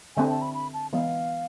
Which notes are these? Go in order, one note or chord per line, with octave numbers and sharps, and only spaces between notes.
D3 A3 C4 G#5
A5
B5
B5
A5
E3 G#3 B3 F5